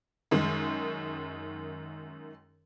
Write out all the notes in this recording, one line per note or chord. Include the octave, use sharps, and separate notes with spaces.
F#2 D#3 G#3